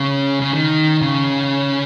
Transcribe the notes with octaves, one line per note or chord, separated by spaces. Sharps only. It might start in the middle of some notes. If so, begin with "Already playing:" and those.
Already playing: C#3
C#3
D#3
C#3